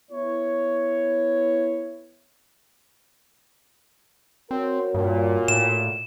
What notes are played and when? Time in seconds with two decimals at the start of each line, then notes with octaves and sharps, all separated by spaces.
0.12 B3 E4 C#5
4.51 C4 F#4 A#4 C#5
4.94 G2 A#2
5.48 A2 E7